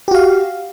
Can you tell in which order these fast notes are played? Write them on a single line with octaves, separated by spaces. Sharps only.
G4 F#4 F5